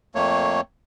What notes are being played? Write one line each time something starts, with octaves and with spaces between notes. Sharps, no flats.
F2 A3 A#3 C#5